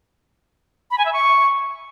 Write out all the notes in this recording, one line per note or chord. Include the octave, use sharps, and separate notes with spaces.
B5
G#5
E5
C#6